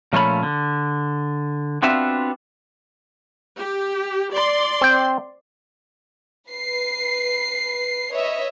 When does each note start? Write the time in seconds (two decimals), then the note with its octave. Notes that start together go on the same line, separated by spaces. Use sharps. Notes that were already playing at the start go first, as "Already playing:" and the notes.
0.13 A#2 F3 A3 C#4 C#5 B5
0.43 D3
1.82 B3 C4 D4 F4 F#4 E5
3.60 G4
4.33 D5 C6
4.81 C4 G5
6.49 B4 C7
8.11 B4 C#5 D#5 E5